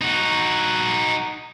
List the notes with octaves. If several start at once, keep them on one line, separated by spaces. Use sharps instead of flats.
D#4 F#4